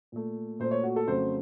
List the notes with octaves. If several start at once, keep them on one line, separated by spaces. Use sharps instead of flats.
A#2 A3
A#2 A3 C5
C#5
F#4
A4
F2 C#3 F#3 A3 C5